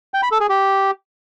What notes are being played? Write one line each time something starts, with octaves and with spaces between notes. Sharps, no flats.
G5
B5
A4
G#4
G4